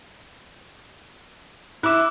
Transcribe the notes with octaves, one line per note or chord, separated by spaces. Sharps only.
E4 D6 E6 F#6